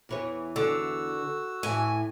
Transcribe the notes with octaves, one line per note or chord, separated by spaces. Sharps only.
E2 E3 C#5
D3 F#4 E6
A2 E3 G#5